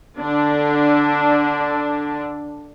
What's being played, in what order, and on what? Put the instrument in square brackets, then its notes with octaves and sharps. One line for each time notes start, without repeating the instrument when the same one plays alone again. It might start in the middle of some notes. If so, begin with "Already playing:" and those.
[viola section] D3 D4